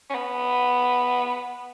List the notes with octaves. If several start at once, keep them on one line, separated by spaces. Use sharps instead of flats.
C#4
B3